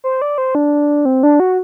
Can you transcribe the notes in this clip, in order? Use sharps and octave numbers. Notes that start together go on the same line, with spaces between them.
C5
D5
C5
D4
C4
D4
F#4